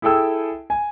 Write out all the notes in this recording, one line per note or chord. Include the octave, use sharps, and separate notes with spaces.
E4 G#4 A4 G5 E6
G#5